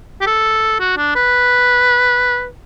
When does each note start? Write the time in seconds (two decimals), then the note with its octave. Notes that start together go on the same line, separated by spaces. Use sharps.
0.21 G4
0.27 A4
0.80 F#4
0.97 D4
1.16 B4